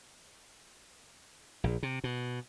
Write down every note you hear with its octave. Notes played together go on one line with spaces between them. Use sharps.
A#1
C3
B2